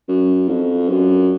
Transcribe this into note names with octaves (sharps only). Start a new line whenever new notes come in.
F#2
F2
F#2